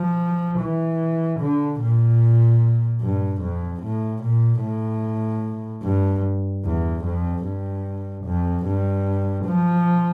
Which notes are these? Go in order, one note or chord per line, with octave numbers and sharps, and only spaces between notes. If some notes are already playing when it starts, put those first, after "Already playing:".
Already playing: F3
E3
D3
A#2
G2
F2
A2
A#2
A2
G2
E2
F2
G2
F2
G2
F3